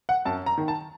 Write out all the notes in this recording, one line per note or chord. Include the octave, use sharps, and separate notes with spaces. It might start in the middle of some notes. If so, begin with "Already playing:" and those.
F#5
F#2 A5
A#5
D#3
A5